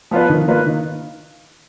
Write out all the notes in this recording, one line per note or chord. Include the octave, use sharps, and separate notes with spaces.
F3 B3 F4 B4
D#3
A#3 F4 B4
D#3